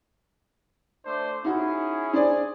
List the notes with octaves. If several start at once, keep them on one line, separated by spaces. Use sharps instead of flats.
A3 D4 C5
C#4 D#4 E4 F#4 G#4
D4 G#4 C5 D5